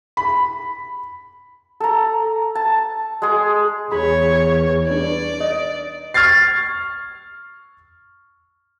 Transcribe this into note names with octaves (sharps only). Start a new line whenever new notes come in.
B5
A4 A#5
A5
G#3 G#4
E2 G#4 C#5 B5
D4 B4 D5
D#5
C#6 F6 G#6 A6 C7